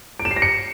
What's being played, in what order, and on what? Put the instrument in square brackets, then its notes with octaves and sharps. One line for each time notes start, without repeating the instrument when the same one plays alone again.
[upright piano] D7
E7
C7
A#6
C#7